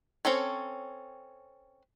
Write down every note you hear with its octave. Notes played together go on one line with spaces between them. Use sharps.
C4 C#4 A4 C#5